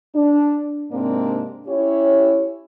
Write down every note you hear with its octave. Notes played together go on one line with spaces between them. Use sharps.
D4
G#2 C3 A#3 C4 D4 D5
C#4 E4 G4 C#5